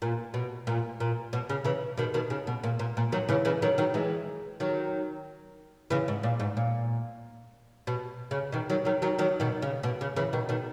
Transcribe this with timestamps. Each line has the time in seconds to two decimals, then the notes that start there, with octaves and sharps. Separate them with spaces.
0.02 A#2
0.34 B2
0.67 A#2
1.00 A#2
1.33 B2
1.49 C#3
1.65 C#3 E3
1.97 B2 D#3
2.14 B2 D#3
2.30 C#3
2.47 B2
2.64 A#2
2.79 A#2
2.97 A#2
3.12 D#3 F#3
3.29 C#3 E3
3.45 C#3 E3
3.62 D#3 F#3
3.78 D#3 F#3
3.94 E3 G#3
4.60 D#3 F#3
5.90 C#3 E3
6.08 G#2
6.23 A#2
6.40 G#2
6.57 A#2
7.87 B2
8.31 C#3
8.52 B2 D#3
8.70 D#3 F#3
8.85 D#3 F#3
9.02 D#3 F#3
9.19 D#3 F#3
9.40 B2 D#3
9.62 C#3
9.83 B2
10.01 C#3
10.16 C#3 E3
10.33 B2 D#3
10.49 B2 D#3